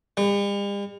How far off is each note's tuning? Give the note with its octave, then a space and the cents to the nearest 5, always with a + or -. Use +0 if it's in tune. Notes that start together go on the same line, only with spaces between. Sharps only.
G3 +45